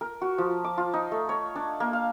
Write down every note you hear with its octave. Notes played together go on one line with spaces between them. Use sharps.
A#4
F#4
F3
D6
F4
D#4
A3
C#5
D4
A#3
F5